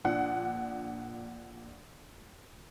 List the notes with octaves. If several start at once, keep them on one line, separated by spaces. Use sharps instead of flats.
A#1 A#2 D4 F#5